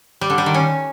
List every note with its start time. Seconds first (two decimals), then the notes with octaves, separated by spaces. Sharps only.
0.21 G3
0.30 D3
0.38 G3
0.46 D#3
0.54 C#4